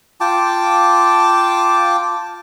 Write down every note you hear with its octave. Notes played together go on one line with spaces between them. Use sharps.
F4 G5 A5 D6